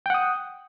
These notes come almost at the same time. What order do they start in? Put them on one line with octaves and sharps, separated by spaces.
G5 F#5 D#6